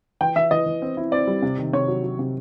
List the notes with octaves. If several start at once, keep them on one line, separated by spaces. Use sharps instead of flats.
E3 G5
E3 E5
E3 D#5
E3
C4
E4
C4 D5
G3
C3
D#3
C3 C#5
F#3
F#3
C3